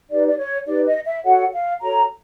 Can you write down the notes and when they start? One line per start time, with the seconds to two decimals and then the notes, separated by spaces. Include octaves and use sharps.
0.10 D#4 G4 B4 D5
0.27 D5
0.38 C#5
0.66 D#4 G4 B4 D5
0.86 D#5
1.05 E5
1.24 F#4 A4 C#5 F#5
1.53 F5
1.82 F#4 A4 C#5 A#5